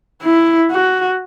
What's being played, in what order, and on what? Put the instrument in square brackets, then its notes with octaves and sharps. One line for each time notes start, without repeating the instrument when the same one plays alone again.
[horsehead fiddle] E4
F#4